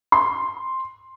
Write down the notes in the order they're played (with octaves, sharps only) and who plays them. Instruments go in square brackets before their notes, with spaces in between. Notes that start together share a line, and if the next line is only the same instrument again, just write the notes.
[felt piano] C6